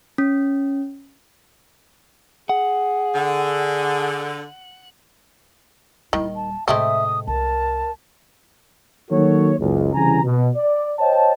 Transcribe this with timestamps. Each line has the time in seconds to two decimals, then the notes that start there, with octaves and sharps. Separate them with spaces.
0.18 C#4
2.49 G#4 F#5
3.14 D3
6.13 D#1 D#3 G3 E4
6.35 A5
6.68 A2 C3 G#3 A3 C4 E5 D#6
7.27 C2 A#4 A5
9.10 D#3 F#3 A#3 F#4 A4 C#5
9.59 F#1 C#2
9.94 C2 C#3 E3 G#5 A#5
10.23 B2
10.56 D5
10.99 C5 C#5 D#5 G5 A5